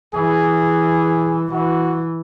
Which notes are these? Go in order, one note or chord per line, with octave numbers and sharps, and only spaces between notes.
E3 G#4
E3 F#4